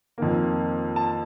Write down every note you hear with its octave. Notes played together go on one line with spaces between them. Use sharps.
F2 D#3 A#3
A5